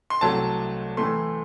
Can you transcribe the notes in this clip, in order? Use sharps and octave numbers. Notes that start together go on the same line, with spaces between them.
C6
C2 C3 F#3 A3 A5
A2 E3 A3 C6